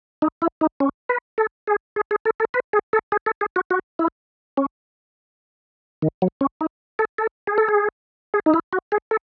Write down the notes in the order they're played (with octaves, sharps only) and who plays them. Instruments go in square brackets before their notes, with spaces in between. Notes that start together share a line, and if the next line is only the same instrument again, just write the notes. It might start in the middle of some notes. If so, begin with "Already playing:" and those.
[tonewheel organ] D#4
E4
D#4
C#4
B4
A4
G#4
G#4
G#4
A4
A4
B4
G#4
A4
G#4
A4
G#4
F#4
F#4
E4
C#4
D#3
F#3
C#4
D#4
A4
A4
G#4
A4
G#4
G#4
D#4
E4
F#4
G#4
A4